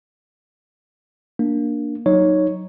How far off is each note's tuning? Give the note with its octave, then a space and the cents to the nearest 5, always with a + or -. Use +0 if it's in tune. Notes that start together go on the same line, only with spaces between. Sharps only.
A#3 +0 D4 +0
F#3 +0 D#4 +0 C#5 +0